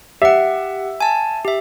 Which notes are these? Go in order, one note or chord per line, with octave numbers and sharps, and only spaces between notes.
G4 E5 F#5
G#5 A5
G4 E5